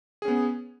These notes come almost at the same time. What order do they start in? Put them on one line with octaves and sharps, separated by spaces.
G#4 C#4 B3